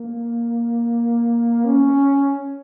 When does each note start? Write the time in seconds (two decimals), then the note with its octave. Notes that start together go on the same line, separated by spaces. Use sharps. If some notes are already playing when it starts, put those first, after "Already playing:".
Already playing: A#3
1.65 C#4